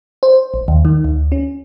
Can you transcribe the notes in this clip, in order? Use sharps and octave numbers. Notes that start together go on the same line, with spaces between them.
C5
A#1
D#2
D#3
D2
C#4